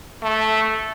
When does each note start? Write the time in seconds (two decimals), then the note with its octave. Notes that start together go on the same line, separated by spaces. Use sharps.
0.23 A3